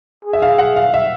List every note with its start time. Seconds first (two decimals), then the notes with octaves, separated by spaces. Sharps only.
0.25 G#4
0.33 E5
0.42 F5
0.58 F#5
0.76 F5
0.94 E5